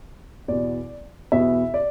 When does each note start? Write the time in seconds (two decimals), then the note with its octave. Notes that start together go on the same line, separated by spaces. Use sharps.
0.48 E2 B2 B3 D5
1.32 E2 B2 B3 E5
1.74 D5